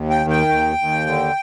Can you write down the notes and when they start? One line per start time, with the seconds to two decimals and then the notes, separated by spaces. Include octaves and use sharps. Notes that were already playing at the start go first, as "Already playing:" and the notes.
Already playing: D#2
0.10 G5
0.21 D#3
0.30 G5
0.49 D#2
0.78 D#2
1.06 D3